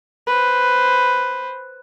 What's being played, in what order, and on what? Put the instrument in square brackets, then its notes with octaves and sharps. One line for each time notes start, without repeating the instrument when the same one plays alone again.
[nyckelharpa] B4 C5